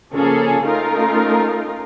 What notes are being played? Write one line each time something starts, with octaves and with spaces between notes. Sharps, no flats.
C#3 F3 A#3 C#4 G#4 A4
A3 C#4 D#4 F4 A#4